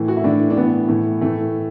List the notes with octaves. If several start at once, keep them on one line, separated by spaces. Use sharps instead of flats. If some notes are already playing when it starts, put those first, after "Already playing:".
Already playing: A2 E3
F#4
E4
A2 E3 D4
D4
A2 E3 B3
A2 E3
A2 E3 A3